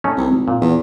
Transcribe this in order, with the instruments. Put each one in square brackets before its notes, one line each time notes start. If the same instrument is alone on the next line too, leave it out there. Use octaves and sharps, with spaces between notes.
[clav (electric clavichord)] A3 C#4 D#4
[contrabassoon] C2
G#1
[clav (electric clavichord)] A#2
[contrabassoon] E2